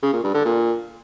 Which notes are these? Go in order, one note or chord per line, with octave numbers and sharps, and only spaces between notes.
C#3
A#2
G2
D3
A#2